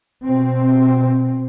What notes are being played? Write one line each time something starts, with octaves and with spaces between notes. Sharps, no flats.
B2 C4